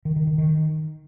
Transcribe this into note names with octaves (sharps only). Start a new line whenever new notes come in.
D#3
D#3
D#3
D#3